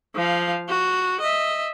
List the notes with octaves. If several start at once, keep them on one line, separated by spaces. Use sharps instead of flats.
F3 F5
F#4
D#5 E5